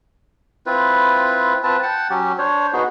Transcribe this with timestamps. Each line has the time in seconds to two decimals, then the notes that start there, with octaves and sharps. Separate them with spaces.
0.66 C4 E4 F4 B4
1.63 C4 F4 B4 A5
1.83 F#5 G5 A5
2.10 F#3 C#4 G4
2.38 D4 C5 C#5
2.73 B3 D#4 F#4 G#4